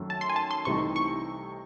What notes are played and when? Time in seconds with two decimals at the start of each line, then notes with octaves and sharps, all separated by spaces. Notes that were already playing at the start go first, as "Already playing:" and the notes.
Already playing: F#2 D#3 F#3 A3
0.10 A5
0.21 C6
0.29 G#5
0.36 A5
0.51 C6
0.65 C2 C3 E3 A3 D#4 C#6
0.96 C#6